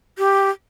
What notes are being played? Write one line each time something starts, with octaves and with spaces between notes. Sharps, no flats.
G4